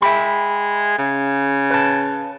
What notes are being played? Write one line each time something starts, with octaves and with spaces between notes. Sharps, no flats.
G#3 E5 G5 B5
C#3
B4 A5